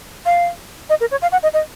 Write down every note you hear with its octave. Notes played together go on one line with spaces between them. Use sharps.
F5
D#5
A#4
C#5
F5
F#5
D#5
D#5